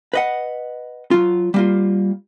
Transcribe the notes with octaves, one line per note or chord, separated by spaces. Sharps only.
B4 D#5 F#5
F#3 F4
G3 A#3 F4